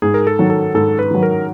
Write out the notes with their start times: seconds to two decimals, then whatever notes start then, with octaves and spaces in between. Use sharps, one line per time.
0.02 G#2 G#4
0.14 A#4
0.27 A4
0.39 D#3 F#3
0.50 A4
0.75 G#2 A4
0.99 B4
1.11 D#3 F#3
1.23 A#4